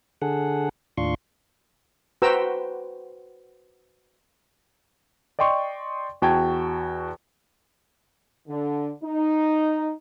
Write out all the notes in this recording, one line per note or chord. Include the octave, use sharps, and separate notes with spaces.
D3 G#4 A4 F#5
D#2 A2 D4 F4 C6 C#6
F#4 B4 C5 G5 A#5 E6
D5 D#5 G5 C6 C#6
E2 F#4 G5 A5 G#6
D3
D#4